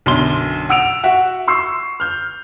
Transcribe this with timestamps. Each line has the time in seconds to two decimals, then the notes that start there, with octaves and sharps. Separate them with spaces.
0.06 B1 F#2 D3 C6 G7
0.69 F#5 E6 D7 F7
1.04 F#4 E5 F#5
1.48 C6 C#6 E6 C7
2.00 F6 G6